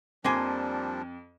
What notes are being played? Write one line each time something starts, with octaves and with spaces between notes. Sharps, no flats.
F2 F3 G3 A#3 D4 C5 G#5